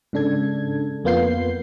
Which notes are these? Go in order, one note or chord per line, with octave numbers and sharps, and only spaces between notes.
G#2 C#3 D4 A4 G#6
F2 A#3 B3 F4 G6 C7